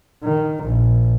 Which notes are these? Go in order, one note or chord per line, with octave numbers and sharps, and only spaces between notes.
D#3
A#1